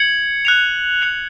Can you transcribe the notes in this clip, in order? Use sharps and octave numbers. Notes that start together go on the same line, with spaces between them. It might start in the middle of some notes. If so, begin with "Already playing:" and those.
Already playing: G#6 C#7 F#7
F#6 C#7 F7
F#6 C#7 F7